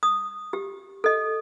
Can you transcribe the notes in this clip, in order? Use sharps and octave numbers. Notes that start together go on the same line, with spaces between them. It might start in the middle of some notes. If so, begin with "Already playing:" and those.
D#6
G4
A4 D#5